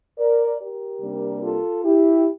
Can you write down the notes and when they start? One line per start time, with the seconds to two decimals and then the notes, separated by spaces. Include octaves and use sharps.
0.18 A#4 D5
0.60 G4 A#4
1.01 C3 G3 A#3 D4
1.43 F4 A4
1.84 E4 G4